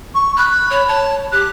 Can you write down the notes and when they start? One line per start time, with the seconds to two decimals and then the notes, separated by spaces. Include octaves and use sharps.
0.15 C#6
0.37 B5 F#6
0.70 C#5
0.88 C#5 A5
1.32 G4 F#6